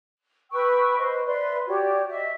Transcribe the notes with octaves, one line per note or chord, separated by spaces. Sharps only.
B4 G5 C#6 E6
B4 C5 D#5
B4 D5 E5 C6
F#4 G4 C#5 D5
D#5 E5